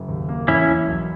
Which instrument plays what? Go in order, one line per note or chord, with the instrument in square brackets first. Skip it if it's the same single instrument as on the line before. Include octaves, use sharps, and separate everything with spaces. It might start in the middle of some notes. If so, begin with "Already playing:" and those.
Already playing: [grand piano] F#1
D#2
A#3
[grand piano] E2 [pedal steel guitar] C#4 E4
[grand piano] E2
B1